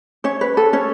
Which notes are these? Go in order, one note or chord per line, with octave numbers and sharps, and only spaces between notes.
C#4 C#5
B4
A4
C#4 C#5